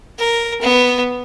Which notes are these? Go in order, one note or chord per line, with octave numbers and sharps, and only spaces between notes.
A#4
B3